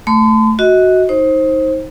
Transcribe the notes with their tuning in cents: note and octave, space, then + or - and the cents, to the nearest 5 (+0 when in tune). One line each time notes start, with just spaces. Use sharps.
A3 +0 C6 -45
F#4 +0 D#5 +30
D#4 +20 C5 +20